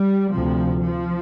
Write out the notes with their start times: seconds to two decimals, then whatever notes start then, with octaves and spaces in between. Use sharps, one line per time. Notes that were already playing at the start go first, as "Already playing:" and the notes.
Already playing: G3
0.33 D2 C3 F3
0.83 F3